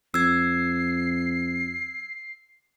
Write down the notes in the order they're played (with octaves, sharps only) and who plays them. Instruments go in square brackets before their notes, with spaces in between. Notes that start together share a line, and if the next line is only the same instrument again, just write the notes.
[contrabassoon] F2 [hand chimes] E6 G#6 [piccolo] C7